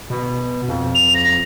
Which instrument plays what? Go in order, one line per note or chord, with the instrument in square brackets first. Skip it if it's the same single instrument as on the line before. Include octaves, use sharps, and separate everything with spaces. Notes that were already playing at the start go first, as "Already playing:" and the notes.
[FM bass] B2
F2
[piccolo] F7
A#6